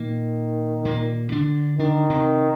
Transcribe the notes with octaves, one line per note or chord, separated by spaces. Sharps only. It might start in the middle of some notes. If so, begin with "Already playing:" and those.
Already playing: A#2 D#3 A#3
A#2 A#3
D3 D4
D3 D#3 D4
C3 C4